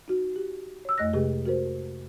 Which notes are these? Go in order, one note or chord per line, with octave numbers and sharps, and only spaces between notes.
D#4 F#4
G4
C#5 E6
F2 A3 D#5 F#6 A#6
C3 G#3 G4 G#4
F#4 A#4 C5